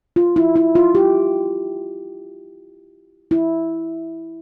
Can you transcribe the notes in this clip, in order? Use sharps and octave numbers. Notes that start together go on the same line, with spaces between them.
F4
E4
E4
F4
G4
E4